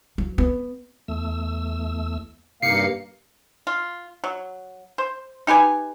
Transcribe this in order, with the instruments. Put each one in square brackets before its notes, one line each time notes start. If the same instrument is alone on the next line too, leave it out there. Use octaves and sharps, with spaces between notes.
[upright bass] F#3
B3
[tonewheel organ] E2 A3 E6
[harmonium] G2 A#3 F5 [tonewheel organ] C3 D#4 G4 [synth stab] C7 C#7
[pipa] F4
F#3
C5
D#4 G4 B4 G#5